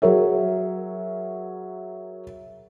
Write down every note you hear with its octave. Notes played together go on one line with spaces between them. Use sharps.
F#3 G#4 A#4 C#5 E5